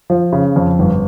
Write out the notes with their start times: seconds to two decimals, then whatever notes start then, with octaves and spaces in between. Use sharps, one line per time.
0.10 F3
0.33 C#3
0.56 F2
0.79 G1